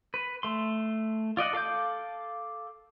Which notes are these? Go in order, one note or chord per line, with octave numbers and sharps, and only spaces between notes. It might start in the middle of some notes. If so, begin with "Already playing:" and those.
B4
A3 C6
F4 D5 D#5 F#5
A4 F5 D6 G6